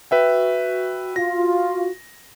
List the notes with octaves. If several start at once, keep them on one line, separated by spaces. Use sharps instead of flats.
F#4 B4 E5 G5
F4 A#6